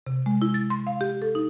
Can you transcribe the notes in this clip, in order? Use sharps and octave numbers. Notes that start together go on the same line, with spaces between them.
C3
G#3
E4
A6
C6
F5
G4
A4
D#4